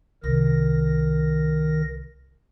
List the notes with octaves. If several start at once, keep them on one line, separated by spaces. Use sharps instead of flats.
C2 D#3 A#4 A#6